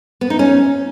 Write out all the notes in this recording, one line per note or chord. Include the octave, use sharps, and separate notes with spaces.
B3
D#4
C#4